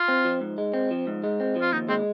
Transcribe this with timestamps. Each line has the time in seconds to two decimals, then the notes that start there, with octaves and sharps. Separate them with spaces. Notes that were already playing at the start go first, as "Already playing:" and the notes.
Already playing: F4
0.08 C4
0.25 F3
0.41 G#2
0.58 G#3
0.74 C4
0.91 F3
1.07 G#2
1.24 G#3
1.40 C4
1.56 F3
1.61 F4
1.72 D#2 D#4
1.89 G#3 C4